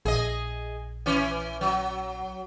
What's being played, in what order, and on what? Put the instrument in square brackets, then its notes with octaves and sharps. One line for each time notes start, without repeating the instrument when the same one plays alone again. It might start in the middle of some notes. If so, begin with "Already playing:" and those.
[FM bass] A#1 [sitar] G#4 D#5
[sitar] E3 C#4
F#3